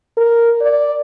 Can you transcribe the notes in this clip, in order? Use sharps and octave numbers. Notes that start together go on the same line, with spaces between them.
A#4
D5